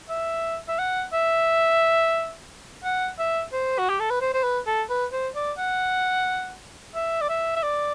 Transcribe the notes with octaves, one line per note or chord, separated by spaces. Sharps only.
E5
E5
F#5
E5
F#5
E5
C5
F#4
G4
A4
B4
C5
C5
B4
A4
B4
C5
D5
F#5
E5
D5
E5
E5
D5